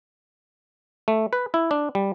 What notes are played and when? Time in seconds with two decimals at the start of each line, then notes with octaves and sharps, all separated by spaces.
1.08 A3
1.33 B4
1.54 E4
1.71 D4
1.95 G3